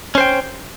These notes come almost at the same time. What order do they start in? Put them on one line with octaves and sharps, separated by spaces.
C#4 C5 G5